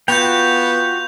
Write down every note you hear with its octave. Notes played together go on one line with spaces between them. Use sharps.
B3 F4 F#4 G5 G6 F7